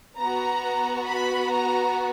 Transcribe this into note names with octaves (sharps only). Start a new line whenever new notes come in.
B3 F#4 A#5
B5
A#5